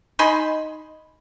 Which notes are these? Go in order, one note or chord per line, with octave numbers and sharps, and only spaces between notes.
D#4 G#5 B5 C6